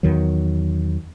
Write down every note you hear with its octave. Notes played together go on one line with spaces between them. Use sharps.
E2 D#3 F#3